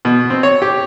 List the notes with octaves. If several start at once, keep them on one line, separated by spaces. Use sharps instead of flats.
B2
C4
C#5
G4